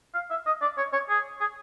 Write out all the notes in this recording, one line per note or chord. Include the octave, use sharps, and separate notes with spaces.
F5
E5
D#5
D5
C#5
C#5
G#4
G#4